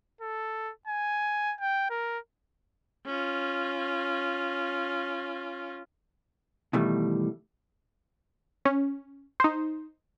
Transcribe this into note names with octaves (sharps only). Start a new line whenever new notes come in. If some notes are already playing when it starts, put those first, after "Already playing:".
A4
G#5
G5
A#4
C#4 F4
B2 D#3 E3 G3 A3
C#4
D#4 C5